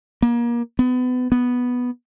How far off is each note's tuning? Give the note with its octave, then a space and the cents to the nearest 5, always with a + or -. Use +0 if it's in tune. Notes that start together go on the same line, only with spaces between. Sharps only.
A#3 +30
B3 +25
B3 -5